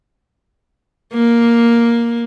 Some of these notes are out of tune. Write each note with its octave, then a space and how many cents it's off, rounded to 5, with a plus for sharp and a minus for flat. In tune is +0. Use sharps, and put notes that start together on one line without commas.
A#3 +5